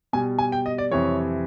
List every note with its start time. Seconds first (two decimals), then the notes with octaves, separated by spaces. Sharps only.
0.13 B2 G3 G#5
0.39 G#5
0.52 G5
0.66 D#5
0.78 D5
0.91 F2 C3 E3 G3 C#5